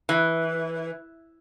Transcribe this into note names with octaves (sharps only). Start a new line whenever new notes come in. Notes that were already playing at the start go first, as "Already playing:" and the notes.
E3